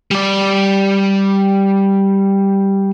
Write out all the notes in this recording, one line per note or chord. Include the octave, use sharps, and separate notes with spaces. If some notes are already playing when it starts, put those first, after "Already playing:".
G3 D5